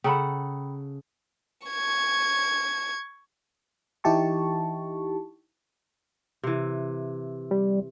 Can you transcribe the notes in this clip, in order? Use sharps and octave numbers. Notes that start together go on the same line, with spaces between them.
C#3 A4 F#5 G5 A#5 B5
C#6 G#6
E3 D#4 E4 G4 A5 C#6
C3 E3
G3